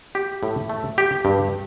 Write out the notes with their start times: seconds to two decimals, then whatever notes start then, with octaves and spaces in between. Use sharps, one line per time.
0.15 G4
0.43 A2
0.69 A3
0.98 G4
1.25 G2